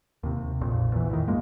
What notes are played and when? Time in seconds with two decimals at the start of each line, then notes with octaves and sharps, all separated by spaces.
0.23 D#2 C3
0.61 A#1 F2 A#2
0.92 E2 A#2 E3
1.10 A2 D#3
1.28 A#1 F#2 G#3 A#3